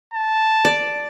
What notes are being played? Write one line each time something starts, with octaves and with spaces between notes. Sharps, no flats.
A5
D5